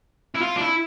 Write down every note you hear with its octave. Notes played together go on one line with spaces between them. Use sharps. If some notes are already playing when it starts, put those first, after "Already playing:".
E4
F4
D4
E4